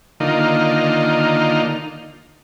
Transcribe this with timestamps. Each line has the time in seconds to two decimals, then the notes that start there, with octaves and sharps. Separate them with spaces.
0.20 D3 D#3 A#3 D#4 F4